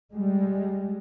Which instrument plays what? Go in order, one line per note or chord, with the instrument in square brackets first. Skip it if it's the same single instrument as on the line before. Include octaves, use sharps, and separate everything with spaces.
[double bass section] G3 G#3